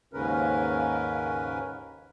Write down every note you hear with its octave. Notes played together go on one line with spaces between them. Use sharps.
D#2 G#2 C#3 C#4 A#4 B4